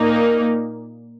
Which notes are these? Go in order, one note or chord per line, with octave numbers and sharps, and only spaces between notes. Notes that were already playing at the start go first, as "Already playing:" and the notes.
Already playing: A#2 A#3 D#4